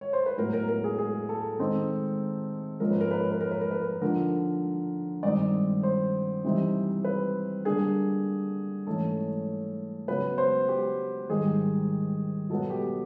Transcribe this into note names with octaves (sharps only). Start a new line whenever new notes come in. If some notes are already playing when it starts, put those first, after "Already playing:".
C#5
C5
B4
A2 F#3 B3 A#4
A#4
A#4
G#4
G#4
A4
D#3 G#3 C4 D#4
G#2 F3 A#3 C#4 A#4
B4
A#4
B4
A#4
B4
A#4
B4
A#4
B4
A#4
D3 F3 A#3 D#4 A#4
G2 D#3 G#3 C4 D#4 D5
C5
C3 E3 G3 C4 D#4
B4
D3 G3 A#3 D4 G#4
G#2 E3 A3 C#4 A4
C#3 F#3 B3 B4
C5
G4
G#2 D#3 G3 G#4
B2 F#3 B3 A4
G4